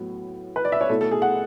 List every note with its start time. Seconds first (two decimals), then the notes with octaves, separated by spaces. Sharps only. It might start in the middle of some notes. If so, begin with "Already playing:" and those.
Already playing: A2 F#3 B3
0.56 B4
0.65 D5
0.72 E5
0.81 C#5
0.89 B2 A3 E4 A4
1.01 A4
1.11 G#4
1.22 F#5